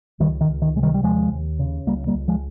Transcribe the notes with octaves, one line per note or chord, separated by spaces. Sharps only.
C#2 D#3 G3
D#3
C#2
D#3
C3 G#3
D#3 G3
G3
D#2 F3 G#3
D#2
C#3
C#2 G3 A#3
G3 A#3
C#2
F3 G#3